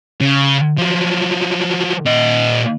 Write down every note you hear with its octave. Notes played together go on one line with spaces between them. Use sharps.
C#3
F3 F#3
A#2 D#5